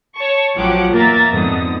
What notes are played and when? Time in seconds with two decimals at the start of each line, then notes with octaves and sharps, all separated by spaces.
0.16 C#5 A5 C#6
0.57 A1 F3 F#3 G4 F#5 D6
0.94 E2 A#3 A#4 E5 A#5 A6
1.28 F2 G#2 D3 B3 D#6